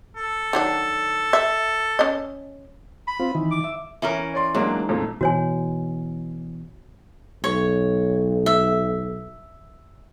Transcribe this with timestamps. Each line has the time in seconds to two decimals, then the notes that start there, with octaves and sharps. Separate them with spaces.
0.16 A4
0.53 D#3 F#3 D4
1.33 E5
1.99 C#4 D#5
3.08 B5
3.20 C4 F4
3.35 D#3 E3
3.51 D6
3.64 E5
4.02 E3 C#4 A#4
4.34 C#5 D5 C6
4.55 G#2 F#3 A#3 D4
4.89 F2 A#2 A4
5.21 B2 E3 F#4 C#5 G#5
7.44 B1 C#5
8.46 E5